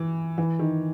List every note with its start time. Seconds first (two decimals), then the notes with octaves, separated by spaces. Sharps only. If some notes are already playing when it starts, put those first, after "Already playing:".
Already playing: E3
0.38 E3
0.59 D#3